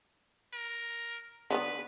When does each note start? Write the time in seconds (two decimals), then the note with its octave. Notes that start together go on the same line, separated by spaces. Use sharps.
0.53 A#4
1.50 D3 F3 B3 B4